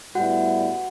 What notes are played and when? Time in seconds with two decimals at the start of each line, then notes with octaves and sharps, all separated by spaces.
0.15 A2 G3 B3 E4 F#4 F#5